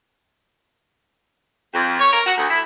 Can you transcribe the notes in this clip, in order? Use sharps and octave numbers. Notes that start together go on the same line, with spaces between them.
F2
C#5
A#4
F#4
D2
E4